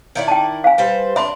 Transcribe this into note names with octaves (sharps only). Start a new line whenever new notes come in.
D#3 E4 D5
G5 A5
F5 G#5
G3 B4 C5
D4 E5 B5 C6